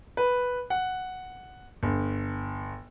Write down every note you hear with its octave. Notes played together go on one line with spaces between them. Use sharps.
B4
F#5
G1